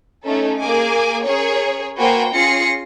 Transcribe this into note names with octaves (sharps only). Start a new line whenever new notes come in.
A3 C#4 D#4 A4
A#3 G#4 G#5 D6
C#4 G#4 A#4 C#5
A#3 F#4 B4 C5 G5 G#5
C#4 F4 G#4 A#6 C7 C#7